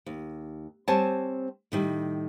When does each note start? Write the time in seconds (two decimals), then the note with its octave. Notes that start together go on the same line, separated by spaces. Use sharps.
0.06 D#2
0.88 G3 C4 C5 C#5 G#5 A5
1.72 A2 D#3 G3